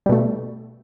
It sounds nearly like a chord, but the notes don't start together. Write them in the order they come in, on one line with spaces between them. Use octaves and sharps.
G3 B2 A3